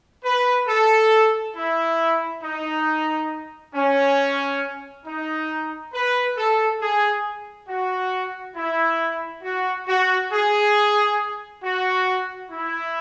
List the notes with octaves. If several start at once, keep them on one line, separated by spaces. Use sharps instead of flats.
B4
A4
E4
D#4
C#4
D#4
B4
A4
G#4
F#4
E4
F#4
F#4
G#4
F#4
E4